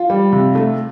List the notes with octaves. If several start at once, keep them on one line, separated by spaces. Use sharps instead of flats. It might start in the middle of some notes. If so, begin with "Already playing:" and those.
Already playing: F4
G3
C3
A3